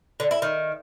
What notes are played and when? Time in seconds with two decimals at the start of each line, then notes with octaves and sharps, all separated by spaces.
0.20 D3
0.31 E4
0.42 D#3